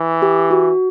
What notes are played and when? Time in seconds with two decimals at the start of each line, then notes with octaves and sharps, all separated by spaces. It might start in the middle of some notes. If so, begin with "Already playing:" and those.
Already playing: E3
0.22 G4
0.51 F#4